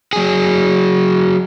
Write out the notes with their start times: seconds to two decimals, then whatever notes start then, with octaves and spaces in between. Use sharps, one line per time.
0.13 F#3 G#4